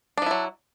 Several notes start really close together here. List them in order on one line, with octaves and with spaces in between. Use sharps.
D4 F3 E4 F#3